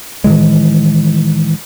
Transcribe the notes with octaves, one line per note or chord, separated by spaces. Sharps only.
A2 D#3 E3 G#3